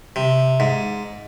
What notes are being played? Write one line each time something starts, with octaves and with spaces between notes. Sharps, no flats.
C3
G#2